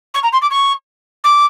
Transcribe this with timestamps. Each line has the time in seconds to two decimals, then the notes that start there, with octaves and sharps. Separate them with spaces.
0.14 C#6
0.23 A#5
0.33 C6
0.42 D6
0.51 C#6
1.24 D6